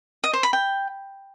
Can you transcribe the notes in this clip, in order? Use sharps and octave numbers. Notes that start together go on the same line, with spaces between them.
D#5
C5
B5
G5